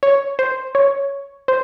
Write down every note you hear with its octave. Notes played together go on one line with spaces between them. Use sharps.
C#5
C5
C#5
C5